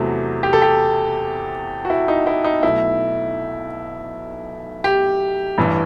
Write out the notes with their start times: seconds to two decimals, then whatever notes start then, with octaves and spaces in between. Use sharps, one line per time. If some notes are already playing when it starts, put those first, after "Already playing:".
Already playing: E2 C3 F#3 A3
0.43 G4
0.53 A4
0.62 G4
1.85 F#4
1.90 E4
2.08 D#4
2.27 E4
2.44 D#4
2.63 B1 B2 A3 E4
4.84 G4
5.58 A1 G2 E3